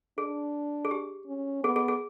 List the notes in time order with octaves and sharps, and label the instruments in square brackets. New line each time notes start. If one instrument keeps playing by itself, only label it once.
[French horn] D4 [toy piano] G#4
[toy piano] G#4
G4
[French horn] C#4
[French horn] B3 [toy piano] G#4
[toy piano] G#4
G#4